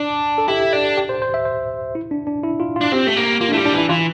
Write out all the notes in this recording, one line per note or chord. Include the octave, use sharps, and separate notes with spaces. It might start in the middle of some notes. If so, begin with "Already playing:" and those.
Already playing: D4
A4
E4 G4
D4
G4
C5
C5
E5
C5
E4
D4
D4
E4
F4
F4
D4
C4 G4
A3
A#3
A#3 F4
D4
A3 E4
G3
D4
E3 E4
E3 F4